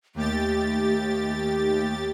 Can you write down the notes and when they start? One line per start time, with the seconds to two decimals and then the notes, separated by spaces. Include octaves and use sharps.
0.15 D#2 A3 G4 A6